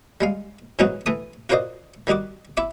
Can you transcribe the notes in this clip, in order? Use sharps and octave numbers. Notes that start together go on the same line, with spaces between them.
G3 G#3 F5
G#2 E3 F#3 C#4 D#4 F#4
E3 A3 D#6
F4 F#4 A#4 C5 D5 D#5
D#3 G3 D#4 F#4 D6
E4 E5 D6